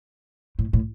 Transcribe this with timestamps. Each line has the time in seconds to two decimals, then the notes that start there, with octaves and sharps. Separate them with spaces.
0.59 A2
0.73 A2